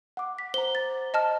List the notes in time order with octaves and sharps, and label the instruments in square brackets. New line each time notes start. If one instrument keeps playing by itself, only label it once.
[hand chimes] F#5 D6
[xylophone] B6
[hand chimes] C5 A#5 [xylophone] G7
[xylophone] A6
D#5 A5 F6